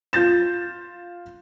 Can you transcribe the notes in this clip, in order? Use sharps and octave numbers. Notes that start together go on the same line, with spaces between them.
F4 G6 A6 E7